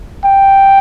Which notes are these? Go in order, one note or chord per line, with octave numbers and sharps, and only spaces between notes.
G5